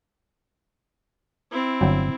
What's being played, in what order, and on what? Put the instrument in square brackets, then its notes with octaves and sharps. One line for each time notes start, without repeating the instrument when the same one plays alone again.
[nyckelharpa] C4 E4
[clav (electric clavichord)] G1 F#3 G5